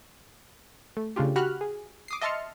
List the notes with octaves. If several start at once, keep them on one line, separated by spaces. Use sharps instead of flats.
A3
C#3 A3 D4 F4 G4
F#4 G4 B5 F6 F#6
G#4
D6 D#6 C7
D#5 E5 A5 C6 F6 C#7